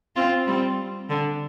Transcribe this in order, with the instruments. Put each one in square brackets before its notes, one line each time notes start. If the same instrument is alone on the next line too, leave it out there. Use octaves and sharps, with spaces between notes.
[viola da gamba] C4 F4
G3 C4
D3